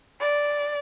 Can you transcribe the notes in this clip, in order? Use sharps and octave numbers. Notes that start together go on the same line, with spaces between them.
D5